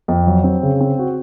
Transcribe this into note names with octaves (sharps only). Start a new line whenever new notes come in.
F2
F#3
C4
C#3
C4
F#4